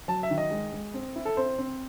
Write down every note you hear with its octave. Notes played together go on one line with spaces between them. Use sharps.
F#3 A5
E5
D#3
D#5
G#3
G#3
C4
E4
A4
C4 C5
C4